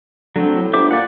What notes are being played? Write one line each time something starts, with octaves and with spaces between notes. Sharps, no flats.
D3 F#3 A3 C4
A2
G1 C5 E5 D6
A#2 D5 F#5